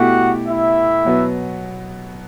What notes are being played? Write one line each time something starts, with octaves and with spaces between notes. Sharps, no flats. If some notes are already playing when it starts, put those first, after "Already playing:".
Already playing: B2 A3 E4 F#4 G4 F#5
E4 E5
B2 F#3 B3